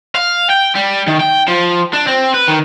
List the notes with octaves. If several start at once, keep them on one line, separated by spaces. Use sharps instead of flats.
F5
G5
G3
D#3
G5
F3
D4
C4
B4
D#3